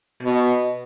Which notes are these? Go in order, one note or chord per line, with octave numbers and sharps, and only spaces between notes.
B2